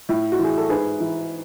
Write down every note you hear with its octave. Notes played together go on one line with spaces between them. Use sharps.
A2
F#4
E3
G#4
A4
G#2 G#4 B4
E3